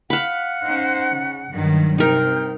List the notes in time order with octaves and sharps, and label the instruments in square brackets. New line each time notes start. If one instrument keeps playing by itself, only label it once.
[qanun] F5 B5 [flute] F#5
[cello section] C#4 D#4 C5
C#3
G2 D#3 F#3
[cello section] C3 [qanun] D#4 A#4 [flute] G5